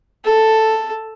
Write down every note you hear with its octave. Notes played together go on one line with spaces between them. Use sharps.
A4